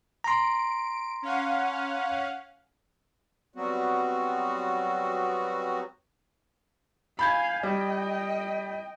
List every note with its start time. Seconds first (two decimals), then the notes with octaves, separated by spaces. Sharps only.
0.24 A#5 C6 D7
1.22 C#4 F5 F#5
3.56 F#3 G3 B3 C4 F#4
7.19 F5 G#5 B5 G6 G#6
7.63 G3 D#5 G5